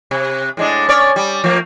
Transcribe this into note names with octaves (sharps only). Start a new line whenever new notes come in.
C3
A2 G#3 D4
C#4 C#5 D5
G3
F3 A3 A#3